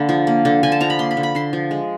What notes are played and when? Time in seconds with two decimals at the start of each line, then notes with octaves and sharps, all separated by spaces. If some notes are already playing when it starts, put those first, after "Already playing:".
Already playing: D3 A#3 D4 B5
0.09 F3
0.27 A#3
0.45 D3
0.63 D3 G#5
0.72 A5
0.80 F3 A#5
0.90 B5
0.99 A#3 C6
1.11 B5
1.17 D3
1.23 B5
1.35 D3 C6
1.53 F3
1.71 G#3